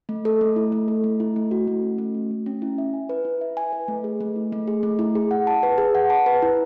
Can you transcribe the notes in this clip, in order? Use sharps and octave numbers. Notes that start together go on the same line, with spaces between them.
A3
A4
A3
E4
A3
A4
A3
E4
A3
F#4
A3
C#4
A3
F#4
A3
C#4
E4
E5
G#5
B4
E4
E5
G#5
B4
A3
G#4
A3
E4
A3
G#4
A3
E4
G#4
F#5
A5
B4
G#4
F#5
A5
B4
E4